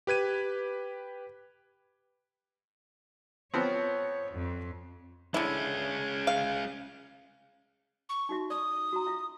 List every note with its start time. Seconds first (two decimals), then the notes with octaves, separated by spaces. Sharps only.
0.07 G4 B4 G#6 D#7
3.54 F3 B3 C4 C#5
4.32 F2
5.34 D3 G#3 C#4 E4
6.27 F5
8.09 C#6
8.29 D#4 F#4 E5
8.50 D5 D6 D#6
8.92 F#4 A#5
9.07 F4 E5